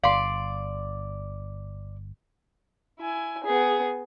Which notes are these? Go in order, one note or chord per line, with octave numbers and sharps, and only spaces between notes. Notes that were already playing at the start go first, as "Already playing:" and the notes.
G1 D5 F5 C6
E4 G#5
B3 G#4